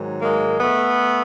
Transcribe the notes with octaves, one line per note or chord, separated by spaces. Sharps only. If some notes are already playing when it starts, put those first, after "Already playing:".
Already playing: G#2 D#3 F#3
G#3 A#3
A3 B3